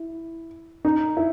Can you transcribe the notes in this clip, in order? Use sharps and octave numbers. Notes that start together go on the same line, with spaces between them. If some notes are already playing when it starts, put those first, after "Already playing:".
Already playing: E4
D#4
E4